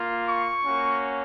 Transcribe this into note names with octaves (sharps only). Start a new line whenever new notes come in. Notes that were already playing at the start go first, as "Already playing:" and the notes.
Already playing: A#3 F4
C#6
A#3 C#4 F#4